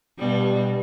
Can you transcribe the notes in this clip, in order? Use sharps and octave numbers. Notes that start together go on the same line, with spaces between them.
G2 B2 G3